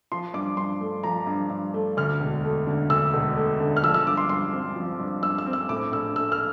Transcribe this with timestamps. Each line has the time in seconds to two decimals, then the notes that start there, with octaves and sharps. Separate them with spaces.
0.12 F3 C6
0.34 G2 D6
0.57 G2 C6
0.81 A3
1.03 F3 A#5
1.27 G2
1.50 G2
1.74 A3
1.97 D2 F6
2.20 E1
2.44 A3
2.67 D3
2.90 D2 E6
3.13 E1
3.37 A3
3.60 D3
3.77 F6
3.83 F3 E6
3.94 E6
4.06 G2 D6
4.17 C6
4.29 G2 C6
4.53 C4
4.76 F3
5.00 G2
5.23 G2 E6
5.38 E6
5.46 C4
5.53 E6
5.69 A2 D6
5.92 A#1 E6
6.15 A3 E6
6.32 F6